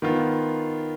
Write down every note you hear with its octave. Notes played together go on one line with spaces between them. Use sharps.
D#3 B3 F4